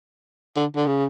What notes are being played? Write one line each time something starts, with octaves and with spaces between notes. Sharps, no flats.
D3
D3
C#3